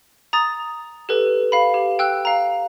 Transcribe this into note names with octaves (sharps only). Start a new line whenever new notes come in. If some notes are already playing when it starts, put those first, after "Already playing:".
A#5 D#6 A6
G4 A4 B4
F5 B5
G4
G5 E6 F#6
F5 A#5